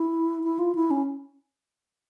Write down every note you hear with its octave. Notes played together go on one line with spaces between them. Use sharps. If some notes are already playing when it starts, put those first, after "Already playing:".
Already playing: E4
E4
F4
E4
C#4